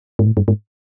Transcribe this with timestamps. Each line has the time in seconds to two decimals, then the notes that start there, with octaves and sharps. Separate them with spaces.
0.19 G#2
0.26 A2
0.37 G2
0.48 G#2